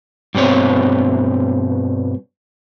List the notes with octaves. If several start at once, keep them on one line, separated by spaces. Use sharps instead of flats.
G2 B2 C4 C#5